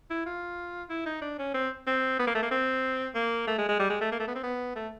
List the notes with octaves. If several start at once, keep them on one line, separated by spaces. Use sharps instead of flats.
E4
F4
E4
D#4
D4
C#4
C4
C4
B3
A#3
A3
A#3
C4
A#3
A3
G#3
G#3
G3
G#3
A3
A#3
A3
B3
C4
B3
A3